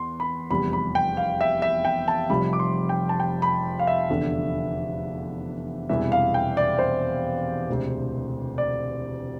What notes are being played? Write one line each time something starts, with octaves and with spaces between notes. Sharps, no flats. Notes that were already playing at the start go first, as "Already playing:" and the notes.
Already playing: E2 C6
B5
F1 E2 C3 G3 B5
B5
G5
F5
E5
E5
G5
A5
F1 F2 C3 G3 B5
D6
C6
G5
A5
G5
B5
F5
E5
F1 E2 D3
E1 E2 C3 E3 G3 E5
F5
G5
D5
C5
E1 D2 C3
D5